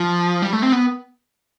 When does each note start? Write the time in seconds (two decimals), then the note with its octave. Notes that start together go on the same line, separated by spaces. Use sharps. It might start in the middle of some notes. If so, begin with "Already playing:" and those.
Already playing: F3
0.42 G3
0.53 A3
0.62 C4
0.72 B3